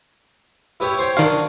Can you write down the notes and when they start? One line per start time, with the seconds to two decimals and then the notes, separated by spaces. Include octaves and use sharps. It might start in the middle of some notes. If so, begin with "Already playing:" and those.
0.80 E4 G4 B4 C#5
0.99 C5 C#5 G5 C6
1.17 D#3 D4 F#4 F5